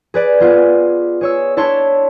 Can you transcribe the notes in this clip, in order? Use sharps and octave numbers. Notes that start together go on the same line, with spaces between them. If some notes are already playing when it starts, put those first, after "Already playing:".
G#4 B4 D5
B3 F4 G#4
G#4 C#5 E6
D4 E4 C#5 A5 C6